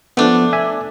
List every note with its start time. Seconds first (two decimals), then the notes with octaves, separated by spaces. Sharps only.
0.17 F3 A3 B3 D4
0.53 E5 G#5